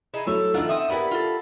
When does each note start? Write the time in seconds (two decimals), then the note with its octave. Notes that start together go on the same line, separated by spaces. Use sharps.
0.14 D#4 E4 G#4
0.27 F#3 A3 E4 A4 C#5 E6
0.54 E3 D4 D#4 F4 A4 F#5
0.69 C4 E5 D#6
0.89 A#3 B3 E4 G4 A#4 D5 B5
1.11 F4 A4